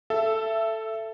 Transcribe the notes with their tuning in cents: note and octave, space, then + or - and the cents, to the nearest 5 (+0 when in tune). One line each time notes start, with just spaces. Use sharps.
A4 +0 E5 +20